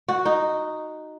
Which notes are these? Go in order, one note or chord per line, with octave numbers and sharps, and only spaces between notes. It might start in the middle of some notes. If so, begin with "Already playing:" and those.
F#4
D#4